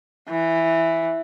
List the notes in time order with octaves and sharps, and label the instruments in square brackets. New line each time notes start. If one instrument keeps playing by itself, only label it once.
[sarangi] E3